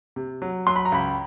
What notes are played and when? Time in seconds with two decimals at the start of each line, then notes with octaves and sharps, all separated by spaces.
0.16 C3
0.42 F#3
0.67 F#3 C6
0.76 B5
0.85 A#5
0.92 C#2 B5